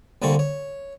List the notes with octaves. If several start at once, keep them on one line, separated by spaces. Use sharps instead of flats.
C2 D3 A#3 C4 A5 C#6
C#5